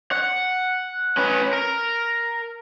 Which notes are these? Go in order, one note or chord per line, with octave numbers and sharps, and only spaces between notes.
F#5
C#4 B4
A#4